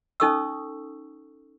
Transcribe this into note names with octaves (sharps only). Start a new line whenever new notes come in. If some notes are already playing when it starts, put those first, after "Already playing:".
C#4 D#4 A4 C#6 D#6 E6